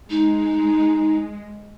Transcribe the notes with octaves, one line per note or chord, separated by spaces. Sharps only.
G#3 D#4